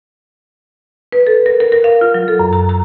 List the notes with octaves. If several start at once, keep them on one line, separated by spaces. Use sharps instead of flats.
B4
A4
A#4
A#4
A#4
F5
F4
F#3
A4
F#2
A#5
A#5